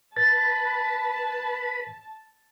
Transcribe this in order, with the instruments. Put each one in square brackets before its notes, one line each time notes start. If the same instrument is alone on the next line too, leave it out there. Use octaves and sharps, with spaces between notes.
[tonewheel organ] B4 B5 [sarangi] A5 [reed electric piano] A6